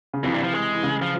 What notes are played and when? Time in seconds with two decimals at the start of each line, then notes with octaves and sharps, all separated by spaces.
0.14 C#3
0.24 F2 C3 E3
0.34 G2
0.43 F3
0.54 G#3
0.73 E3
0.83 C#3
1.02 F3